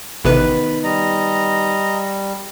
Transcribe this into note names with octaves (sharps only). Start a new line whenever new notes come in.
A1 C3 D#3 B3 B4 B5
G3 D#5 A#5